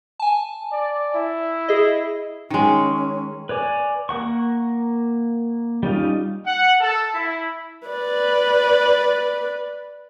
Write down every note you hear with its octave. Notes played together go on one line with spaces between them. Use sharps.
G#5 A5
D5
E4
G#4 D#5
D#3 G#3 C#4
B4 C#5 D5 G#5
A#3 A#4 F#5 C#6
G3 C#4 D#4 F4
F#5
A4
E4
B4 D5